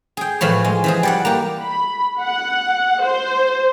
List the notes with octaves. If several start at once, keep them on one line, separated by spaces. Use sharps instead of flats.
G#4 G5
A2 E3 F3 C#5
G#3
E3 F3 G#4
G3 D5 F#5
A#3 G4
B5
F#5
C5